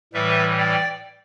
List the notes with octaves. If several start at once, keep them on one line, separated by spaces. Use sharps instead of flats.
A2 E3 G3 B4 E5
D5 G5